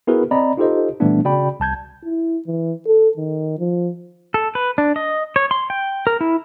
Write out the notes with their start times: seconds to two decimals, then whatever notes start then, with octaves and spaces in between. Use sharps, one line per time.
0.07 B3 E4 F#4 G#4 A#4 B4
0.31 C4 D5 D#5 A#5 B5
0.57 D#4 F4 G4 A4 C5 D#5
1.00 A#2 E3 G3 A3 B3 D4
1.25 C#3 F#4 D5 G5 B5
1.60 C2 A5 G6 G#6
2.04 E4
2.47 E3
2.87 A4
3.17 D#3
3.59 F3
4.34 A4
4.55 B4
4.78 D4
4.96 D#5
5.36 C#5
5.51 C6
5.70 G5
6.07 A#4
6.21 E4